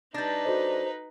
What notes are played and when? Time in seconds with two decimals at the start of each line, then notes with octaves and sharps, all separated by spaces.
0.14 G3 D4 D#4 B4 G6 A6 A#6
0.45 F#4 A4 C5 D#5